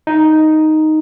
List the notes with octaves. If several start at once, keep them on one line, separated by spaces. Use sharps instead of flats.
D#4